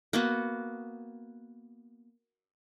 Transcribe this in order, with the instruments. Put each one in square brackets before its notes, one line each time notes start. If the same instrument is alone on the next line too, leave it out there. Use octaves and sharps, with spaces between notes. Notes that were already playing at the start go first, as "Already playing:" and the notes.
[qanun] A#3 B3 F#4